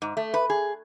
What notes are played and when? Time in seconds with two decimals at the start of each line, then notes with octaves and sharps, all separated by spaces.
0.02 G#2
0.17 A3
0.34 B4
0.50 G#4